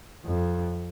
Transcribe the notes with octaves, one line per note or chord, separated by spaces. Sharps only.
F2